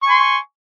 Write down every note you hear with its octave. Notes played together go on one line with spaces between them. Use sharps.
G#5 C6 C#6